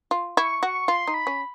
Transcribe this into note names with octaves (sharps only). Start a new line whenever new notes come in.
F4
E4 C#6
F#4 C#6
F4 C6
D#4
B5
C#4